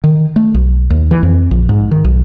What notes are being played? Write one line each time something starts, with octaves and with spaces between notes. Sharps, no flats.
D#3
A3
B1
D#2
E3
F2
A#1
G#2
D#3
B1